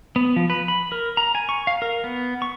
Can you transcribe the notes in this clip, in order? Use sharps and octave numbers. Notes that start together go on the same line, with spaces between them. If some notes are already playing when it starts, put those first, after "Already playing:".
B3
F3
B4
B5
A#4
A#5
G#5
C#6
F5
A#4
B3
C#6